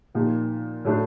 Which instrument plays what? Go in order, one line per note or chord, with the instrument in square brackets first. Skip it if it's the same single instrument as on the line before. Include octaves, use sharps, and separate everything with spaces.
[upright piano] A#2 F3 A#3 D#4 G4
A2 F#3 A3 D4